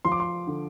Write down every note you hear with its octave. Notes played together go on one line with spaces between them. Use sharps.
F3 C6
D6
C6
D3